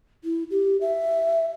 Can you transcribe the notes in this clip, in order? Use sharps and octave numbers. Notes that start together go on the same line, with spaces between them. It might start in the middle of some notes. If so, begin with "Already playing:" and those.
E4
G4
E5